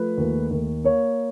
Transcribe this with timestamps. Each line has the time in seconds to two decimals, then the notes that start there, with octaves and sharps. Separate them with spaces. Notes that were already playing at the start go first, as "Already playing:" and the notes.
Already playing: F3 A3 B4
0.18 D#2
0.51 D#2
0.84 A#3 C#5